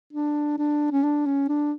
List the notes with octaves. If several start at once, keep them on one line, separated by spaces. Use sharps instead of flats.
D4
D4
C#4
D4
C#4
D4